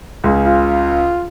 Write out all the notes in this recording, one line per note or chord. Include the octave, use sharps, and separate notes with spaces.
C#2 C#3
F4